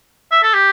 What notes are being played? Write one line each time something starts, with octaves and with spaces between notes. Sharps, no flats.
E5
A4
G4